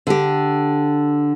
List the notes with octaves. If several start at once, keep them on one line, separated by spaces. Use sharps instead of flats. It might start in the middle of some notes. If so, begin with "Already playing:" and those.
D3 G4